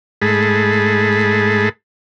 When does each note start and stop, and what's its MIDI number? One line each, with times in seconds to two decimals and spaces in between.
0.22 1.69 44
0.22 1.69 56
0.22 1.69 57
0.22 1.69 68
0.22 1.69 81
0.22 1.69 83